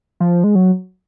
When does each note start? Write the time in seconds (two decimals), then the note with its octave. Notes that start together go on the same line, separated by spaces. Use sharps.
0.20 F3
0.44 G#3
0.55 F#3